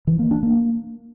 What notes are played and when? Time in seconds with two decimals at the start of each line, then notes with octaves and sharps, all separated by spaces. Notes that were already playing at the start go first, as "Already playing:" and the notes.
0.07 E3
0.19 A#3
0.31 D4
0.43 A#3